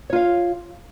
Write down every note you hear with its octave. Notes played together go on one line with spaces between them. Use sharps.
F4 C#5 F5